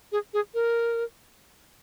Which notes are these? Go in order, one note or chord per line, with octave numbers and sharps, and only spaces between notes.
G#4
G#4
A#4